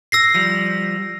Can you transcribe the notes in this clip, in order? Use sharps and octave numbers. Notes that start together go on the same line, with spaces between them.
E6 A#6 C7
F3 G3